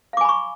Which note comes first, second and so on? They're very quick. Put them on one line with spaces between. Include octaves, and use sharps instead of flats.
F5 D6 G#5 B5 C#6